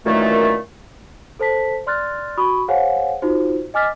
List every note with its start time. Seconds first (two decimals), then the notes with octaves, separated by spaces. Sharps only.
0.06 F#2 A#2 D#3 E3 A3
1.39 A4 C5 A5 B6
1.87 D5 C6 F6 F#6 A6
2.37 F#4 B5 C#6 D#6
2.68 G#4 C5 C#5 F5 F#5 G#5
3.22 D#4 F4 F#4 C5
3.74 D#5 G#5 D6 F6 A6 B6